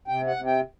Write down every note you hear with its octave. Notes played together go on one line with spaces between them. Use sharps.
C3 G5
F#5
C3
G5